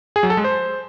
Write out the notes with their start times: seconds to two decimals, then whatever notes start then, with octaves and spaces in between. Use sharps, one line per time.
0.16 G#4
0.23 F#3
0.30 A4
0.37 G#3
0.44 C5